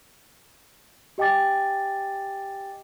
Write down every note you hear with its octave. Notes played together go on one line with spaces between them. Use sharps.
G4 D#5 G5 G#5 D6 A6